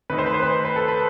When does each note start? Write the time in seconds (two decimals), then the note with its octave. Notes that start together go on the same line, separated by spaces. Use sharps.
0.10 D#3 A3 D#4 B4
0.18 C5
0.26 B4
0.34 C5
0.42 B4
0.65 B4
0.76 A4
0.88 B4